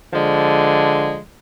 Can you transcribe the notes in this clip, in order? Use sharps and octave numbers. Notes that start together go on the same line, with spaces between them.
D3 F3 G#3